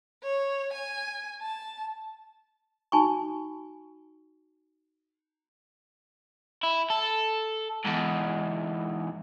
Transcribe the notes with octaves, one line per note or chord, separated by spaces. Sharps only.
C#5
G#5
A5
D#4 F#4 G#5 A5 B5 C#6
E4
A4
E2 G#2